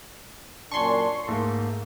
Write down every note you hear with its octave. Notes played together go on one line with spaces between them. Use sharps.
F#2 A#2 D4 G#5 A5 C6 C#6
G#2 A3 A#3 A4